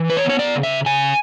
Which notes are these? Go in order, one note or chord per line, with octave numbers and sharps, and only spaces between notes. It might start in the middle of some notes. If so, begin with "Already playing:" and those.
Already playing: E3
B4
C#5
B3
C#5
D5
C#3
E5
C#3 G#5